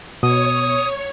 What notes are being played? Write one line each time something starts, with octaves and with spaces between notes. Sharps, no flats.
B2 C#5 D#6